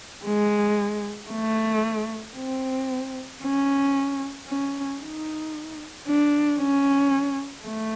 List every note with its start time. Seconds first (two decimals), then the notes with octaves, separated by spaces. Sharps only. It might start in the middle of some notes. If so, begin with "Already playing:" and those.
0.26 G#3
1.31 A3
2.37 C4
3.43 C#4
4.48 C#4
5.01 D#4
6.07 D4
6.59 C#4
7.65 A3